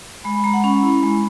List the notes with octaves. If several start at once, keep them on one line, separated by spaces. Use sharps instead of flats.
G#3 B5
B5
G#3 A#5
F#5
C#4 B5
E4
G#3